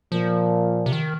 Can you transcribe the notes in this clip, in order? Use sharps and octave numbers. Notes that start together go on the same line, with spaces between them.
A#2 F3
C3
D#3